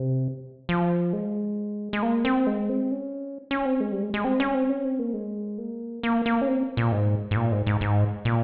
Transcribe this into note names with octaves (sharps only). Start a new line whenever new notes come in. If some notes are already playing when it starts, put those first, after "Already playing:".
Already playing: C3
F3
G#3
G#3
A#3
C4
G#3
C4
C#4
C#4
C4
G#3
G3
G#3
G#3
C4
C#4
C4
C#4
C4
A#3
G#3
A#3
A#3
A#3
C#4
C4
A#2
G#2
G#2
A#2
G#2
G#2
G#2
A#2